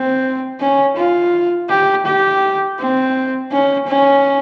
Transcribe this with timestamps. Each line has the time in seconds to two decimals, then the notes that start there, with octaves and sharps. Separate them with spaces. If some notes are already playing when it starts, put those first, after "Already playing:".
Already playing: C4
0.60 C#4
0.97 F4
1.69 G4
2.06 G4
2.79 C4
3.52 C#4
3.87 C#4